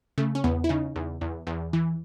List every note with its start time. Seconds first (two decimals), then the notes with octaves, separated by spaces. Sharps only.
0.18 C#3 A3
0.35 C#4
0.44 E2 B3
0.64 E4
0.69 C#3 D#4
0.96 E2
1.21 E2
1.47 E2
1.73 E3